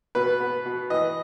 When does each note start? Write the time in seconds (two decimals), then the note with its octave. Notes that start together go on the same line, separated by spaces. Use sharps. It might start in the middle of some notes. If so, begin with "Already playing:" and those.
0.15 B2 B4
0.40 B3
0.66 B2
0.90 E3 D#5